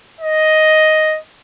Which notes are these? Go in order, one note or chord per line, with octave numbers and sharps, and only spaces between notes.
D#5